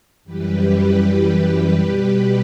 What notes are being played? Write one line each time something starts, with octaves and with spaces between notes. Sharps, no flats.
F#2 E3 G3 G4 B4
B2 G3 G4 B4